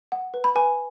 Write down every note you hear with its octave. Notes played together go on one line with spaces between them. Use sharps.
F#5
B4
B5
B4 G#5